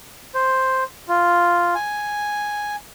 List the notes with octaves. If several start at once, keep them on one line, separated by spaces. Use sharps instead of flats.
C5
F4
G#5